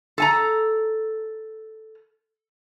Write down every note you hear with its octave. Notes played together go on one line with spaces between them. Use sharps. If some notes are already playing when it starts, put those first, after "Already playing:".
A4 G#5 A#5